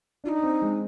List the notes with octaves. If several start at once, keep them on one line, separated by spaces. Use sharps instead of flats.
D4 D#4 F4
C4
G#3